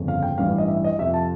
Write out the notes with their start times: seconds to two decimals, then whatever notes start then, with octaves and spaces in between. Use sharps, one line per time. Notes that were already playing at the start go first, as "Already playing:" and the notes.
Already playing: G1 F2 C#3
0.08 F5
0.23 G5
0.38 A1 G2 E3 G3 F5
0.58 D#5
0.68 E5
0.84 D#5
0.99 F2 C3 F3 E5
1.14 A5